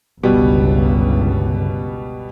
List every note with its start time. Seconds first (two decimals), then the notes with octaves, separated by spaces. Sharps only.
0.23 G1 C#2 B2 G3 B3